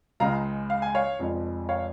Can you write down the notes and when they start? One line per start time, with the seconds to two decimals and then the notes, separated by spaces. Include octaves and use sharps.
0.20 C#2 C#3 G#3 F5 A#5
0.70 F5
0.82 G#5
0.95 C#5 F5
1.19 F1 F2 F3 G#3
1.69 C#5 F5